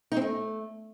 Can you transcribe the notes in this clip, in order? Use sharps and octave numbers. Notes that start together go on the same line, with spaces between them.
D#4
C4
A3